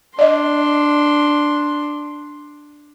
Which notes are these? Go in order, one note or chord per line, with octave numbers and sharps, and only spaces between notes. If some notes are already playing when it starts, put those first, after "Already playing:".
D4 D5 D#5 C6